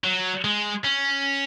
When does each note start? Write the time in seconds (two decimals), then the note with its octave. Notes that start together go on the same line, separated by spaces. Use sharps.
0.04 F#3
0.44 G#3
0.85 C#4